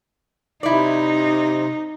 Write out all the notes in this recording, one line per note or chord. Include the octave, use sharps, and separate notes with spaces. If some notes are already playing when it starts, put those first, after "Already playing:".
C3 D#4 E4 D5